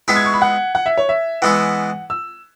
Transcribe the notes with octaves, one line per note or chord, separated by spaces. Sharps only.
G#3 B3 E4 G#4 B6
G#6
C#6
B5
F#5
F#5
E5
C#5
E5
E3 G#3 B3 E4 F#5
E6